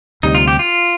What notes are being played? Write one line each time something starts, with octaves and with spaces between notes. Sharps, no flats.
D2 C3 G3 D#4
F4
G4
F4